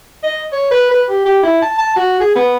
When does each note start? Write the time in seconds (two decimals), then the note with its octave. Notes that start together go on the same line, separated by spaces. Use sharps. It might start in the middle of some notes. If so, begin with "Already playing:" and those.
0.24 D#5
0.52 C#5
0.71 B4
0.91 B4
1.09 G4
1.25 G4
1.43 E4
1.62 A5
1.78 A5
1.96 F#4
2.20 G#4
2.35 B3